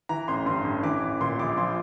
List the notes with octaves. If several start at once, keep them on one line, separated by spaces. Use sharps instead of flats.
E3 A#5
A1 C6
G2 C6
A1
E3 D6
A1
A#2 C6
A#1 D6
F3 C6